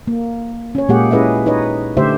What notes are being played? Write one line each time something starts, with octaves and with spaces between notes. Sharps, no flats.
A#3
C#4 C#5
A#2 G#3 A#3 G4 G#4 F#5
C#4 E4 G#4 B4 D#5 E5
D#4 B4 C#5 D#5
D3 A3 D4 G4 C5 E5